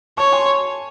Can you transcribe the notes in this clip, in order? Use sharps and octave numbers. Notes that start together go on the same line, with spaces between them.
C#5 A5 C#6
G#5 C6